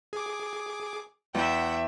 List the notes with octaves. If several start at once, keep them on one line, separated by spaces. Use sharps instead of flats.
G#4 D6
E2 E4 E5 F#5 G5 G6